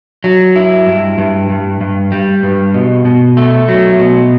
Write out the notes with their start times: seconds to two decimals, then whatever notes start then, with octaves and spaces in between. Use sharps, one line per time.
0.24 F#3
0.56 E4
0.87 G2
1.18 G2
1.50 G2
1.81 G2
2.12 G3
2.43 G2
2.74 B2
3.05 B2
3.37 A3
3.68 F#3
3.99 B2